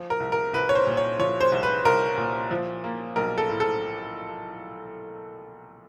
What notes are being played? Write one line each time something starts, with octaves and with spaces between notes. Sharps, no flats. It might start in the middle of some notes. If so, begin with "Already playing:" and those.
Already playing: F3
A#4
C2
A#4
C2 B4
C#5
C5
A#2
C#5
F3 C#5
C5
C2
B4
C2 A#4
A#2
F3
A#3
B1 A#4
A4
A2
A4